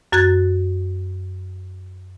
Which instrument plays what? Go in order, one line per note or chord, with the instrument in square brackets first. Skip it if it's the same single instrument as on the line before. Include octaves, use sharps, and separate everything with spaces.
[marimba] F#2 F#4 F#6 G#6 A6